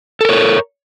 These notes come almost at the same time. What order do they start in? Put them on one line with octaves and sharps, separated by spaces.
A4 A#4 C#5